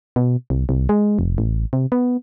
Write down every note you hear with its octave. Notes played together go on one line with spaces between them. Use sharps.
B2
C2
C2
G#3
F1
A1
C3
B3